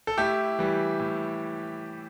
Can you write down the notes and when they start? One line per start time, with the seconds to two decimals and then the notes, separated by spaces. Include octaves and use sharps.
0.07 A4
0.18 A2 E4 G4
0.59 E3 G3
1.00 A2